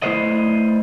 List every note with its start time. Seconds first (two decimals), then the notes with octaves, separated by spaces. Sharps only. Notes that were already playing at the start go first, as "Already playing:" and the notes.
0.02 A3 E4 B4 C5 D5 D#5